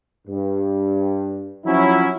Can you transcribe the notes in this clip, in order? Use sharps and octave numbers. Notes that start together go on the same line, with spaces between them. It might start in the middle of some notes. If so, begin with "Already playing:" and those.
G2
F3 F#3 C#4 E4